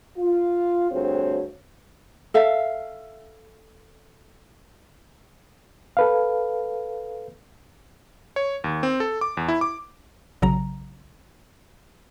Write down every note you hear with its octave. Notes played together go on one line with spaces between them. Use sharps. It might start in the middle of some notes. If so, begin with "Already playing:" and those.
F4
D2 G2 C4 F#4 G#4 C#5
A4 E5 F5
A4 B4 F5
C#5
D#2
C4
A4
D6
E2
E4
D6
A#1 C#3 F#3 A#5